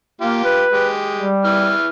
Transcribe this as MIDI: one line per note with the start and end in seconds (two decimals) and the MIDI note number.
0.21 0.41 58
0.21 0.64 65
0.21 0.64 67
0.45 0.88 71
0.72 1.30 56
0.72 1.30 67
1.16 1.74 55
1.44 1.89 52
1.44 1.89 64
1.44 1.89 89